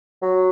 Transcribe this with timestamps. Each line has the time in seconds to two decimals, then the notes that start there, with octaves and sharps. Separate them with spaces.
0.22 F#3